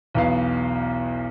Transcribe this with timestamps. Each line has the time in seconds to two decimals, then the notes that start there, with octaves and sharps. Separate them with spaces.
0.14 B1 E2 B2 B3 F5